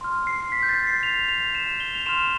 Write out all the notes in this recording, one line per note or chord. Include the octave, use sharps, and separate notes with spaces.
C6 F6
C7
B6
G6
A6
C7
F7
F7
E7
G7
F7
C6 F6 E7